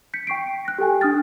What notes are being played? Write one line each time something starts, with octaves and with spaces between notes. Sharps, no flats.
G6 B6 C#7
G5 C#6 C7 D7
F#6 A#6
G4 A4 G5 G#5
D4 D#6 F6 A6